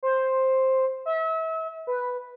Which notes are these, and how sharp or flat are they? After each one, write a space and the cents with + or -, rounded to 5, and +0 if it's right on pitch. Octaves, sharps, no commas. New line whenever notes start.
C5 +5
E5 -35
B4 +0